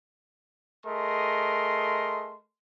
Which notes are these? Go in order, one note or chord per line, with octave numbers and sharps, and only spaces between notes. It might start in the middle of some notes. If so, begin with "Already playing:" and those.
A3 G#4 A#4 D#5 C6